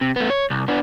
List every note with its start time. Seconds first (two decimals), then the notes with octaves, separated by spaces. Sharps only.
0.01 C3
0.16 A3 B3
0.30 C#5
0.50 C2
0.68 B3 D4